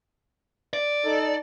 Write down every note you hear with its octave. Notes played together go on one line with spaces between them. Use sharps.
D5
D#4 A4